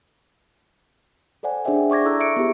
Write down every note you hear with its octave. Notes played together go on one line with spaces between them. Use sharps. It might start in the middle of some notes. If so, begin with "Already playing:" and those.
A4 C5 D5 F#5 G#5
D4 G#4 C5 D5 E5 G5
D5 C#6 D6 G#6 A#6
E4 A4 A#5 E6 F#6
E5 C#6 C#7 D7
B3 E4 G4 G#4